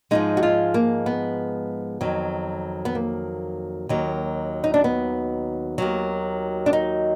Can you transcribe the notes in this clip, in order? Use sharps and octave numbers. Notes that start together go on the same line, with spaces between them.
G#2 F3 G#3 D#4
F#4
F4
A#3
B3
F2 D#3 F#3
B3
A#3
D#2 D#3 F#3
D#4
D4
B3
D#2 D#3 F#3
D4
D#4